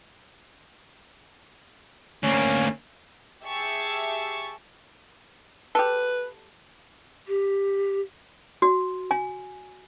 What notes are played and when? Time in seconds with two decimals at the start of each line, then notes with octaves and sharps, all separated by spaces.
2.24 D2 A#3 C#4
3.46 G4 G#4 E5 A5 C#6
5.75 G4 A4 B4
7.28 G4
8.62 F#4
9.11 G#5